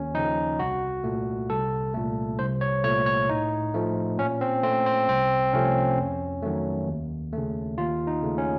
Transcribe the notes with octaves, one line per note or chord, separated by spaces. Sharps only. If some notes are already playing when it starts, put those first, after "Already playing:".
Already playing: D#2 C#4
C#3 F3 D#4
C2 F#4
A#2 A3
C2 A4
A#2 A3
C2 C5
C#5
A#2 A3 C#5
C#5
A2 D#4
F3 A3
A#2 C#4
C4
A3 C4
C4
C2 C4
C3 F3 A3 C#4
F2
D#3 F#3 A3
D#2
C#3 A3
D#2 F4
D#4
C#3 A3
C#4